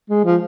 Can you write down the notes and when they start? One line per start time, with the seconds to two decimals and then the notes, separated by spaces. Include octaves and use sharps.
0.10 G#3
0.25 F3